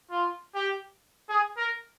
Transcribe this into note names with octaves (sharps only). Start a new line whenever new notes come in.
F4
G4
G#4
A#4